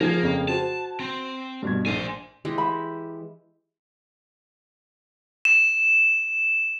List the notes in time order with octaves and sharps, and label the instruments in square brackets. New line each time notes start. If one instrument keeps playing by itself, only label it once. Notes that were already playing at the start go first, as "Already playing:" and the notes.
[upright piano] F3 G#4 G#6 [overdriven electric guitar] A#3
[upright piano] F2 C#3
[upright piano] F#4 C5 [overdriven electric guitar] A5
[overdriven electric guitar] C4
[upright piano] G2 B2 G#6
[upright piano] A#1 [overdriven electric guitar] C5 G#5
[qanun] E3 G#3 G4 [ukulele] E4
[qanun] E5 [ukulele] B5
[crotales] E7